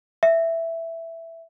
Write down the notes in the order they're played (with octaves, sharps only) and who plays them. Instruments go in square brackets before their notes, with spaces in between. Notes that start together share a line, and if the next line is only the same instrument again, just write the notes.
[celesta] E5